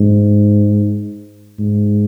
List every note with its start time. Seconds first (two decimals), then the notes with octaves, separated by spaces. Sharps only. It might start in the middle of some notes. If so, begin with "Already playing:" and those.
Already playing: G#2
1.59 G#2